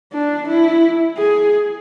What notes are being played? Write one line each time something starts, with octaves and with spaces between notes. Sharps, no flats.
D4
E4
G#4